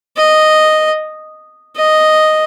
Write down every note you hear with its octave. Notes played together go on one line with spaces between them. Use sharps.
D#5
D#5